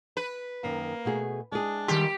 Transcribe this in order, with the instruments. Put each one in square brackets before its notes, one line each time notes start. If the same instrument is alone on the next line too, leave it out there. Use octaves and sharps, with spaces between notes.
[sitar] B4
[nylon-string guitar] F#2 D#3 [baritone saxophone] A#3
[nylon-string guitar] B2 A3 G#4
[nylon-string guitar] G#3 E4 G#4 [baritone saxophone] D4
[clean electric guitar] D#3 G3 C6 [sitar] G4